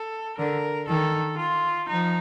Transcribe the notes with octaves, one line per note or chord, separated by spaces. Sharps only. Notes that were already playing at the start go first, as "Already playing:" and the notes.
Already playing: A4
D3 A#4
D#3 A4
F4
F3 D#4